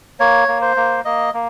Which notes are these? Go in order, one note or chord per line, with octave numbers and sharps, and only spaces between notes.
A#3 C#5
A#3
C5
A#3
A#3 D#5
A#3